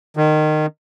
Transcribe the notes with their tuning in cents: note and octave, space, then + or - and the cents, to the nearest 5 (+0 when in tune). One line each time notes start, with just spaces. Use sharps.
D#3 -20